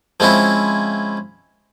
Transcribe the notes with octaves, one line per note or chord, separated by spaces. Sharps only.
F3 G#3 C4 C#4 E4